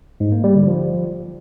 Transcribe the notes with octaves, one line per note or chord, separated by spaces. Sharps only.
G#2
A#3
G3
D3
F3